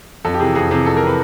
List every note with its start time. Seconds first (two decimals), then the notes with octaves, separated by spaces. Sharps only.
0.25 F2 A4
0.34 G4
0.40 C3 E3 G#4
0.55 F2 G#4
0.71 C3 E3 G#4
0.86 F2 A4
0.97 A#4
1.02 C3 E3 B4